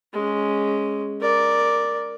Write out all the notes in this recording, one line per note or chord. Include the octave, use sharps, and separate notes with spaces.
G#3 C#4
A#4 D5